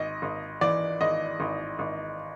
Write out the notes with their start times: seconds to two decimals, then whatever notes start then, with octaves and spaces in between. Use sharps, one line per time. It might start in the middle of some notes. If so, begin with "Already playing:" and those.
Already playing: G#1 D#5
0.22 G#1
0.61 E3 D5
1.01 G#1 D#5
1.40 G#1
1.79 G#1